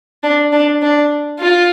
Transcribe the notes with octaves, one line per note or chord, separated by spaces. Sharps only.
D4
D4
D4
F4